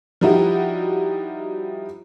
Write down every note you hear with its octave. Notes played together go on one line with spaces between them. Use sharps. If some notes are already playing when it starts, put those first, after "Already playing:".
F3 G3 D#4 E4 F#4 G4